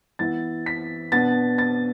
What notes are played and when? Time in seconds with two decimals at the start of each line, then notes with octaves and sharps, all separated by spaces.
0.19 E3 B3 E4 A6
0.66 B6
1.12 B2 B3 D4 A6
1.58 A6